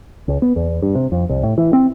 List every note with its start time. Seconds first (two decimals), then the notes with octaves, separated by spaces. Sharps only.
0.28 C#2
0.42 B3
0.56 E2
0.82 G2
0.95 C3
1.12 F2
1.29 C2
1.43 A2
1.58 E3
1.73 C4